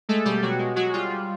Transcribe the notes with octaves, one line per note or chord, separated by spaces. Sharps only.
G#3 A3 A4
B2 G3 G4
B2 F#3 F#4
G#3
F#3 G#3 F#4
G3 F4
G3